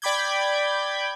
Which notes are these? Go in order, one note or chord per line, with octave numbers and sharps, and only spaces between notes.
D5 G5 B5 D6 G6 G#6